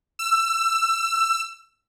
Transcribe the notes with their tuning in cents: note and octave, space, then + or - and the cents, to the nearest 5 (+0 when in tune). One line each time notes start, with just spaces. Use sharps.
E6 +20